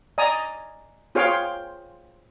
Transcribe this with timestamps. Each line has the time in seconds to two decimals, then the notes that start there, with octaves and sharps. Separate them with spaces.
0.18 D5 D#5 G#5 A#5 D#6
1.15 F4 G#4 C5 C#5 F5 G5